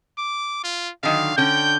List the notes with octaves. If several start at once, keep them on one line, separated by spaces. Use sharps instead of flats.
D6
F4
D3 D#3 F#3 F5
D3 C#4 G5 G6